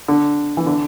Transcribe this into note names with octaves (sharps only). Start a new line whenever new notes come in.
D3
E3
D3